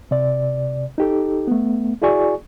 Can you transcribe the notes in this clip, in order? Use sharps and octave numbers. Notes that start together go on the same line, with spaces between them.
C3 D5
D#4 G4 A4
A3 B3
E4 F#4 G#4 D5 G#5 C#6